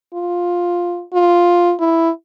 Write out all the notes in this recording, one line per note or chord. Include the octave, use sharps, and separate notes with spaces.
F4
F4
E4